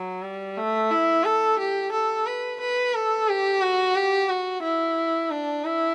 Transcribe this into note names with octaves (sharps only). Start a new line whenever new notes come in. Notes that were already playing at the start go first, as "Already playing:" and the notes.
Already playing: F#3
G3
A3
E4
A4
G4
A4
B4
B4
A4
G4
F#4
G4
F#4
E4
D4
E4